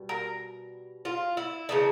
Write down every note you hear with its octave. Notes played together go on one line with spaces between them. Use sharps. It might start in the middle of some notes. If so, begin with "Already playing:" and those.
Already playing: B2 G3
A#4
F4
E4
C#3 E3 A3 D#4